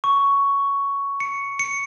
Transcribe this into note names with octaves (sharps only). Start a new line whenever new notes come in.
C#6
C#7
C#7